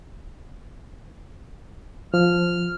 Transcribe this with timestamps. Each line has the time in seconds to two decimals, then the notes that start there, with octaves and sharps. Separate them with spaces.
2.14 F3 F6